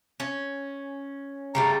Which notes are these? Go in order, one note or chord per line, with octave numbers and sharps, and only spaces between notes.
C#4
C#3 G3 A3 A#5